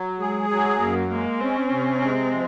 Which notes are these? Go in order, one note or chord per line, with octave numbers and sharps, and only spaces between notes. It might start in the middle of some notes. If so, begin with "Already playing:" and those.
Already playing: F#3
G#3 G#4
F#3
F#2 A#3
G#3 A#3
C4 C#4
C3
G#3
F3